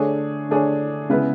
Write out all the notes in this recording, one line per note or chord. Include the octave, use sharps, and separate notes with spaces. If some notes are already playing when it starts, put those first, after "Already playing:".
Already playing: D3 A3 D4 G#4 C#5
D3 A3 D4 G#4 C#5
C#3 G#3 B3 E4 B4